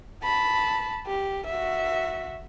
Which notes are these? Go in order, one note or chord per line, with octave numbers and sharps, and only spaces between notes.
A5 B5
G4
F#4 E5